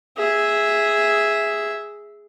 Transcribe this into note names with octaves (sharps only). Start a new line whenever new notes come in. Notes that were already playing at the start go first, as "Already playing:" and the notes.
G#4 E5